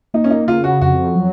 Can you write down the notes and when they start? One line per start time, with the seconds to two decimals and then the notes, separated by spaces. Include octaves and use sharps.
0.14 A#3 D#4
0.24 C#4
0.30 D#4
0.47 C#3 F4
0.64 F#4
0.81 F2 F#4
1.15 F#3